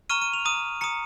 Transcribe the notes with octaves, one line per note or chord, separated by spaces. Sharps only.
A#5 C#6 F6 D#7
D#7
F7
A#5 D#6 D#7
A#5 D#6 C#7